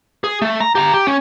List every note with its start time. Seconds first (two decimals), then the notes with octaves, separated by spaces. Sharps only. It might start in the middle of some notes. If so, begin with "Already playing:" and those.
0.24 G#4
0.42 A3
0.60 A#5
0.75 G4 A#5
0.94 G4
1.07 C#4